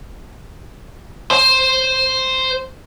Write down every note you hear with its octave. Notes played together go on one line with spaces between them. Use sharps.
C5 C6